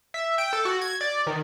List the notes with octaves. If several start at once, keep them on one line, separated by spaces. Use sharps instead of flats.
E5
G5
A4
F#4
G#6
D5
D#3